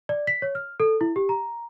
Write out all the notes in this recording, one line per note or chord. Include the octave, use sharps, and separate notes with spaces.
D5
B6
C#5
F6
A4
E4
G4
A#5